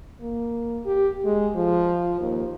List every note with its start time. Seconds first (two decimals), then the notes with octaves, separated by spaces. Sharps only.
0.21 A#3
0.86 G4
1.25 G#3
1.56 F3
2.20 D#2